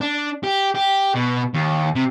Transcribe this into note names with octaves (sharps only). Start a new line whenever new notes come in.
D4
G4
G4
B2
D#2
C3